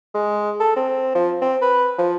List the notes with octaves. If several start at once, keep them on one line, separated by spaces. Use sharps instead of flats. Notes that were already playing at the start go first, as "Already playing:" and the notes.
G#3
A4
C4
F3
C4
B4
F3